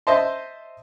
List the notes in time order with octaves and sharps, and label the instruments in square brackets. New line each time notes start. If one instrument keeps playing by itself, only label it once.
[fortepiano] C5 D#5 E5 A5 C6